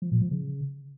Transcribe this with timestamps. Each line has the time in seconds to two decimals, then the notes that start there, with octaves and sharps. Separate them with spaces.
0.02 F3
0.12 A#2
0.21 F3
0.31 C#3